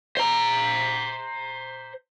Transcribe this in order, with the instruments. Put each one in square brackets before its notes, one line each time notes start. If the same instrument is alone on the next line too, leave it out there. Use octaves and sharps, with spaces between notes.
[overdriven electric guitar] C5 A#5